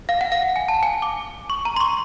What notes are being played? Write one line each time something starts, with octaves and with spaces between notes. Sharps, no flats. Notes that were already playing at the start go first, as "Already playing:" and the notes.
F5
F#5
F5
G#5
A5
G#5
D6
C#6
A#5
C6
C#6